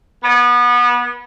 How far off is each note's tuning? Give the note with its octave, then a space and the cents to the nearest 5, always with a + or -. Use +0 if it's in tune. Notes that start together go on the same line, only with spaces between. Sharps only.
B3 -25